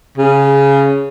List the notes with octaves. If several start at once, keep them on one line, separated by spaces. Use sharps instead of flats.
C#3